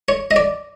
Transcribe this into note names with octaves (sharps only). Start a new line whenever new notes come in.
C#5
D#5
D5